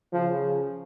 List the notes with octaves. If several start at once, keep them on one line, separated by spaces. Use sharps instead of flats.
C#3 F3